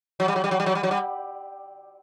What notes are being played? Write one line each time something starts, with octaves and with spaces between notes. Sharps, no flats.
F#3
G3
F#3
G3
F#3
G3
F#3
G3
F#3
G3